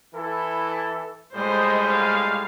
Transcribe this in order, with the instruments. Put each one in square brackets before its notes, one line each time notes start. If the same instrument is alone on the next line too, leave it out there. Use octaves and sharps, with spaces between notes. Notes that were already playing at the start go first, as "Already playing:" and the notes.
[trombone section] E3 E4 A4
[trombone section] A2 G3 G#3 [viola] C5 D#5
[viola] F5